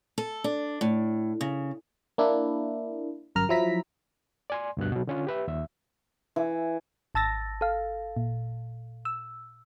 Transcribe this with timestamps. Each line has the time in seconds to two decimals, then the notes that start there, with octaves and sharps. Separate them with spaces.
0.18 A4
0.44 D4
0.81 A2
1.41 C#3
2.18 A#3 D4 E4
3.35 G1 F#2 A#4 A#5 F6
3.49 F3 F#3 E4 A#5 B6
4.50 D5 G#5 C6
4.77 D2 G2 B2 F#6
4.92 B2 F#3
5.07 D3 C#4 F4
5.27 G4 B4 E5
5.48 D#2 E5
6.36 E3
7.15 G#1 A5 E6 A6 A#6
7.61 A4 F5
8.17 A#2
9.05 E6